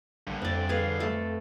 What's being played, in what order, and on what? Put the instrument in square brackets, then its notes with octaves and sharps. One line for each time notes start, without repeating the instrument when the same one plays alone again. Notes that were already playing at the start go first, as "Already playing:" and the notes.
[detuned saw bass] A#1 [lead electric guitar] G2 D3
[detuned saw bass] F2 [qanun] C4 D5
[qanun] G#4 B4 F5
A3 A4